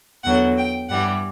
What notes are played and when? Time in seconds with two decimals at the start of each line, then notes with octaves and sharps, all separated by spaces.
0.23 E2 D3 F#3 F#5
0.57 G5
0.88 G2 E3 G3 F#5